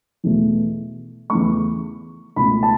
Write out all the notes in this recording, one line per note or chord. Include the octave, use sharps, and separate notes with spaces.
E2 B2 A3
E2 C#3 A3 C#6
C#2 B2 A3 B5
A5